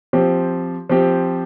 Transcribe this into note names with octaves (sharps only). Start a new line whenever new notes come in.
F3 C4 G4
F3 C4 G4